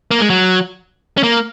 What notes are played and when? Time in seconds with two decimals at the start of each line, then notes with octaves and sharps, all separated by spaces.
0.11 A#3
0.21 G#3
0.30 F#3
1.18 C#4
1.23 A#3